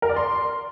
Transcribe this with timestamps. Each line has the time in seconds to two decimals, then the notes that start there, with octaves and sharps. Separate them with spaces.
0.02 A#4
0.09 D5
0.16 C6